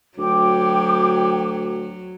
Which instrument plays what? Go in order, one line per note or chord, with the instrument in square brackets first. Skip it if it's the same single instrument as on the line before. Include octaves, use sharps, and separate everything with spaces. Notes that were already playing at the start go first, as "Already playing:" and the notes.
[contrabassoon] D2 [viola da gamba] F#3 [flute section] G5 D6